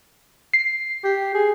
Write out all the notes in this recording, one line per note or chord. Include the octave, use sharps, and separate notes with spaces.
C7
G4
G#4